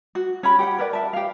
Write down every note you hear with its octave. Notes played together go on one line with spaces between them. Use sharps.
F#4
C#4 G4 G5 B5
G4 F#5 G5
A#4 B4 D5
E5 A5
G4 F5